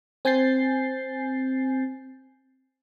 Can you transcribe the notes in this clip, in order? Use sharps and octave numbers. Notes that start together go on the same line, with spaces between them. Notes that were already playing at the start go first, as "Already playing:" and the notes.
C4 G#5 G6 A6 C7